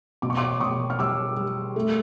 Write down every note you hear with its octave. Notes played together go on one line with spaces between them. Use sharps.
B2 D6
C#6
C6 D6
B2 C#6 D#6
F6
G3 D6 E6
G3
A3